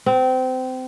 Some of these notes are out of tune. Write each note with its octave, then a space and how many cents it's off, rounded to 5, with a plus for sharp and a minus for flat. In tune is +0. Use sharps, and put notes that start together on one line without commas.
C4 -25